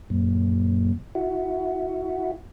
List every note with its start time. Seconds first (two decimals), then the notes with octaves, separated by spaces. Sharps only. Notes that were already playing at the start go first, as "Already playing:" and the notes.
0.10 F#2 A#2
1.15 E4 F#4